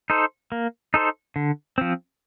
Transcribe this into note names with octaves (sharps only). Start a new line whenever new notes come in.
D#4 A4 C5
A#3
D#4 A4 C5
D3
F3 C4